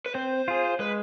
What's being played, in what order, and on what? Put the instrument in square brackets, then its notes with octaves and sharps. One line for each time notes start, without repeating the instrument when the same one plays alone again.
[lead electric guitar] B4
[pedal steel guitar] C4 [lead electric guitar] C5
[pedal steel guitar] F4 G#4
[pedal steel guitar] G#3 [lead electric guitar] B4